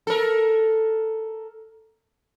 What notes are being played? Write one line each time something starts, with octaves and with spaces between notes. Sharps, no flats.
A4 A#4